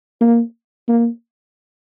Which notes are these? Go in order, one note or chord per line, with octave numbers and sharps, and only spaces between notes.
A#3
A#3